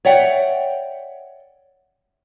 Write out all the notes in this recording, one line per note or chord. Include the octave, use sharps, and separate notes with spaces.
C#5 D5 E5 F#5 G5